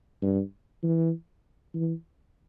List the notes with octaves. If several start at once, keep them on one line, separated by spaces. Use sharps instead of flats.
G2
E3
E3